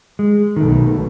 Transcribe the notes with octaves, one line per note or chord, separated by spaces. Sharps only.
G#3
B1 B2 D#3 A3